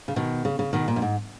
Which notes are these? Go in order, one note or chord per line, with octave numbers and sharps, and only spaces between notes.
C#3
B2 D#3
C#3
C#3
B2 D#3
A#2
F#2
G#2